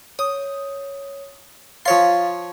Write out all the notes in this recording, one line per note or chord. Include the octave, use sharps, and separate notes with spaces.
C#5 D#6
F3 C#5 F5 C6 A6